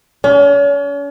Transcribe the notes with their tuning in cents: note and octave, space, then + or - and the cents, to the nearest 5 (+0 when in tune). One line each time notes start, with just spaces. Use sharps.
C#4 +40